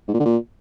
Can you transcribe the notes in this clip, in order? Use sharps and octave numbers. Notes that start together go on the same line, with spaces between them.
G#2
A#2
D3
A#2